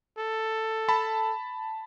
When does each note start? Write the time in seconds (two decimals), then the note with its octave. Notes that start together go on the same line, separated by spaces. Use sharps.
0.18 A4
0.88 A5 B5